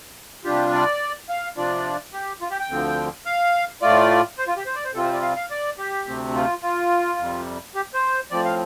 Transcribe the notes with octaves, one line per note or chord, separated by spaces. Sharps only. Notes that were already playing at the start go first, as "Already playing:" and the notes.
C3 G3 D4 F4 G4
D5
F5
C3 F3 D4 F4 D5
G4
F4
G4
G5
D2 D3 F3 C4
F5
A2 A3 F4 D5
C5
F4
G4
C5
D5
C5
C3 G3 C4 F4 A4
C5
D5
F5
F5
D5
G4
D2 C3 A3 C4
F4
F4
F2 C3 G3
G4
C5
A2 F3 C4 D5
F5